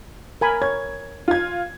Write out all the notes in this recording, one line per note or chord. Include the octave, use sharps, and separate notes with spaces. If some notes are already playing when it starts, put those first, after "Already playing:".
A#4 G#5 B5
C#5 G#6
F4 G#6